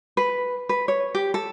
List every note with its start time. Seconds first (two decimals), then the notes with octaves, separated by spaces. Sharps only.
0.17 B4
0.69 B4
0.88 C#5
1.15 G4
1.34 A4